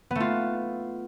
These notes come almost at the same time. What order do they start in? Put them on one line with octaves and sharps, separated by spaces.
B3 A3 F4